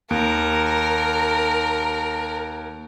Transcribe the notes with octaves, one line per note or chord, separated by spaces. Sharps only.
D#2 A#4 D7